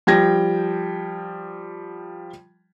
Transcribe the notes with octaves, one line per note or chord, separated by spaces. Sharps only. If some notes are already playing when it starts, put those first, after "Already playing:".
F3 G3 G5 G#6 A#6